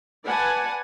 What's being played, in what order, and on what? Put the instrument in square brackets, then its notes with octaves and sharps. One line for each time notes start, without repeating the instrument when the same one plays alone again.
[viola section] B4 D5 F#5 G#5 A5